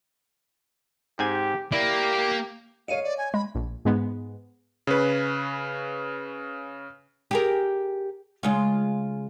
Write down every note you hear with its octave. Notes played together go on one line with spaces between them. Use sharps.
G#2 C4 G4 G#5
A#3 E4 G4 D5
C#5 D#5 F5 C#7 D#7
D5
G#5
G#3 B5
A#1
G#2 G#3 B3
C#3 C#4 B4
G4 G#4 A#4
C#3 G#3 F4